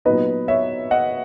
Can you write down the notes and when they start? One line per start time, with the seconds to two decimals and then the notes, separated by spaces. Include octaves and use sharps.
0.05 A#2 F#3 B3 D#4 B4 D#5
0.48 C#5 E5
0.91 D#5 F#5